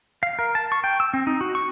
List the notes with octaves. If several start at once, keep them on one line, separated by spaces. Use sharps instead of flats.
F5
A#4
A5
C#6
G5
E6
C4
D#4
F#4
C#6